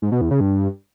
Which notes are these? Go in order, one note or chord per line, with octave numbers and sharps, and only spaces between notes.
G#2
B2
E2
C#3
G2